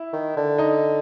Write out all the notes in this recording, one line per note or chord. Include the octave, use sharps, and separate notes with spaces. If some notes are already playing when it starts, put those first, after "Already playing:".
Already playing: E4
D#3
D3
D#4